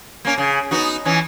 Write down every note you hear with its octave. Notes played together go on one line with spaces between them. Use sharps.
A#3 C#4
C#3
B3 D#4 F#4
E3 C#4